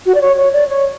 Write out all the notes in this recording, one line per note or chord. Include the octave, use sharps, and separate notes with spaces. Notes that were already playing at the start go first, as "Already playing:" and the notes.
F#4
D5
C#5
C#5
D5
C#5